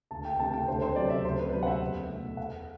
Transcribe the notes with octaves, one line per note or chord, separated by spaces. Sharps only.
D2 A5
G5
C3 E3 A3 C4 A5
G5
D2 C5
C5
C3 F#3 C4 D5
E5
D2 C5
B4
C3 F#3 B3 C5
F#5
E5
E2
B2 A3
E2 F#5